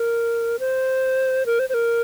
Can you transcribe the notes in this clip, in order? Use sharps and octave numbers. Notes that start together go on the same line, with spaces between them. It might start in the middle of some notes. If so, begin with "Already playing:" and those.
Already playing: A#4
C5
A#4
C5
C5
A#4